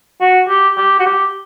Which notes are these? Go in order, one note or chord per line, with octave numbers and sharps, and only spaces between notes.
F#4
G4
G4
F#4
G4